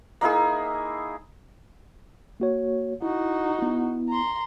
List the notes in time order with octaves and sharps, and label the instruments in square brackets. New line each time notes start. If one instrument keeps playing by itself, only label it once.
[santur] A#3 D#4 E4 G#4
[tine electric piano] A#3 F#4 C#5
[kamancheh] D#4 F#4 [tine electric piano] E4
[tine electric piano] B3 E4
[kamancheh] A#5 C6